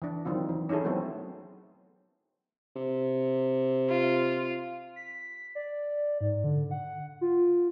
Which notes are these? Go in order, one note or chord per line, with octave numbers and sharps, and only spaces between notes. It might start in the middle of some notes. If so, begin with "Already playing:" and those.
E3 D4
D#3 F#3 C4 F4
E3
C#4 D#4 E4 G#4 A4
F#3 A3 B3 C4
C3
F4
B6
D5
G#2
D3
F#5
F4